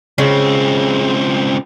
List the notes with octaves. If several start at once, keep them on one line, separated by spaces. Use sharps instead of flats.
C#2 C#3 C4